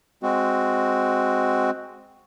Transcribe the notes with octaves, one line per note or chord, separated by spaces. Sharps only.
G#3 C4 F#4